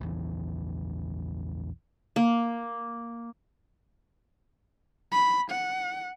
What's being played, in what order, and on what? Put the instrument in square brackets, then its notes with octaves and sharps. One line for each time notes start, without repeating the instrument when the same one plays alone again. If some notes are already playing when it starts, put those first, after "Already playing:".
[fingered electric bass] A#1 E2 E3
[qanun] A#3
[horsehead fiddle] B5
F#5